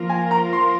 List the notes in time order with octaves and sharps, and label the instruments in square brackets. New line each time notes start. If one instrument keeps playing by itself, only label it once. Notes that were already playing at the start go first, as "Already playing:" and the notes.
Already playing: [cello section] F3 A#3 F4 A#4
[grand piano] G#5
A#5
C6